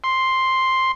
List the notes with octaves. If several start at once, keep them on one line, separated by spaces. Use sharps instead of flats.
C6